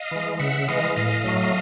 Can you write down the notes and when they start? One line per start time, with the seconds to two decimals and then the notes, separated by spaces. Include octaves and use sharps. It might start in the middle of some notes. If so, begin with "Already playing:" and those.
Already playing: D#5 F5
0.11 E3 G#3
0.39 C#3 E5 F#5
0.68 E3 G#3 D#5 F5
0.96 A2 D#5 F5
1.24 F#3 A3